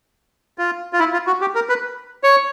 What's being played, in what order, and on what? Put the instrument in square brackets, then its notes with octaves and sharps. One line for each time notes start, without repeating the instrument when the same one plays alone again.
[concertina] F4
F4
E4
F4
F#4
G4
A#4
B4
C#5